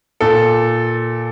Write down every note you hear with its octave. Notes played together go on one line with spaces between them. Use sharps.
A#2 A4